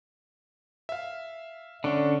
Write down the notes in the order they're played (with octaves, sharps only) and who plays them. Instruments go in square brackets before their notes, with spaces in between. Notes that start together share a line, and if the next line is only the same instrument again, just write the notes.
[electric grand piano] E5 F5
[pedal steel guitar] D3 C#4 [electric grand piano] D4